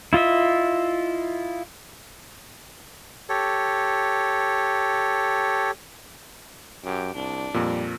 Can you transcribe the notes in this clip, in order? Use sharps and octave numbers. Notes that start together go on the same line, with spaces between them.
E4 F4 D#5 E5
G4 A4 C#5
F#2 G4
C2 D4
F2 A#2 G3